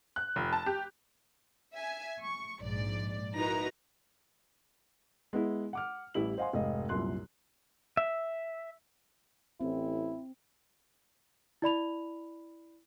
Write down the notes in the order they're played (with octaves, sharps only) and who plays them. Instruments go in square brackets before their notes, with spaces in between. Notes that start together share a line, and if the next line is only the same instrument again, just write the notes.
[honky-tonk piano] F#6
F1
A5
G4
[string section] E5 G#5
C#6
A#1 G#2 D5
D#4 E4 F#4 A#4 B4 A#5
[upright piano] G#3 B3 E4
F#5 D6 F6
A1 G3 E4 F#7
C5 D#5 F5 F#5 G#5 C6
F1 G#2 D#5 F5
C2 F#2 A#2 C6 F#6
[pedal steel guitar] E5
[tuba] A1 [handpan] C4 [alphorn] E4
[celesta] E4 D5 B5 F7